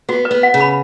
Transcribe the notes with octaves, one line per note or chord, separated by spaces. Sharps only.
B3 F#4
B4
B3
F#5
C#3
B5